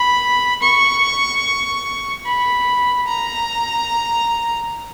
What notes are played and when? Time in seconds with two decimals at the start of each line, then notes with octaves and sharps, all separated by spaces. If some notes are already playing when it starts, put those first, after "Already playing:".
Already playing: B5
0.62 C#6
2.26 B5
3.08 A#5